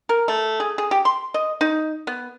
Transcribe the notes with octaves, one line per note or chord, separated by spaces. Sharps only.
A#4
A3
G#4
G#4
G4
C6
D#5
D#4
B3